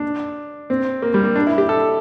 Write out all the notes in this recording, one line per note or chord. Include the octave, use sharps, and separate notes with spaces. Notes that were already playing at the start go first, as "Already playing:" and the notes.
Already playing: D4
C4
A#3
G3
A#3
D4
E4
G4
A4